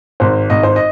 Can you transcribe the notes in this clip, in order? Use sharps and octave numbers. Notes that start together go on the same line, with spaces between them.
G#1 C5
G#1 D#5
C5
D#5